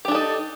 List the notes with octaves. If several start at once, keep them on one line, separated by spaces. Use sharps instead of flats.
D4 D#4 G4 A4